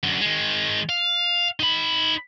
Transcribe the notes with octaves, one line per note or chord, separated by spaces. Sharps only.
F#2 D3
D#3 G#3
F5
D#4 B5